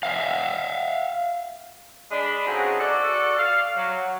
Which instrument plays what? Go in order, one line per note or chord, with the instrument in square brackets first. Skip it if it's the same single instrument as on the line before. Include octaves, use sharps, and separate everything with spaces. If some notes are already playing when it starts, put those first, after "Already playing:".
[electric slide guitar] E5 F5
[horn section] G#3 D4 B5
C#3 A3 C4 D#4 F#4 G#4
F#4 A4 D5
F5
F#3